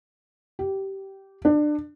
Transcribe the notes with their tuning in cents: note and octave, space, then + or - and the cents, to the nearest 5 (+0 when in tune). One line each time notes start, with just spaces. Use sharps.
G4 -15
D4 +25